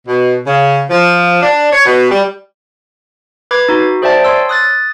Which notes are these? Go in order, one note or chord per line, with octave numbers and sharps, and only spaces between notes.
B2
C#3
F3
D4
C#5
B2
G3
B4 B5 D6 G#6
D#4 F#4
G#4 C5 D5 E5 G5 A5
C#5 C6 E6
D#6 F#6 A6